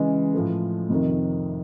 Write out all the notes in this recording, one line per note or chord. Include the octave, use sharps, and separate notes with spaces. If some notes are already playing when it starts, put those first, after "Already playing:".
Already playing: C#3 E3 G#3
A2 F3 A3
F2 C3 D#3